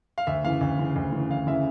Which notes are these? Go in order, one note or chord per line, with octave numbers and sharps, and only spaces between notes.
F5
D2 E5
C#3 E3 F5
D2
C#3 E3
D2
C#3 E3
D2 F5
C#3 E3 E5